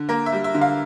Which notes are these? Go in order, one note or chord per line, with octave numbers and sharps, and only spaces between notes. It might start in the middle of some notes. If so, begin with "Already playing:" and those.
Already playing: D3
A#3 A#4
E5
G3
E5
D3
F5